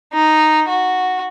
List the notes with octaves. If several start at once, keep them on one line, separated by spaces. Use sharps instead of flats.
D#4
F#4